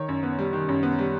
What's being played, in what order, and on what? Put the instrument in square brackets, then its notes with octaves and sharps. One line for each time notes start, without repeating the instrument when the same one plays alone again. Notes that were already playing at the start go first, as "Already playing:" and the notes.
Already playing: [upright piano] D#3 C#5
F#2
B3
G3
D#3
F#2
B3
G3